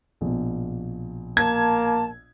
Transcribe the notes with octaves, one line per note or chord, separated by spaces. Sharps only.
A#1 B2
A#3 A5 G#6